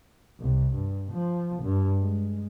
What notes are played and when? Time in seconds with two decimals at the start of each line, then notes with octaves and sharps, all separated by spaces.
0.40 C2
0.75 G2
1.12 F3
1.63 G2
2.01 G#3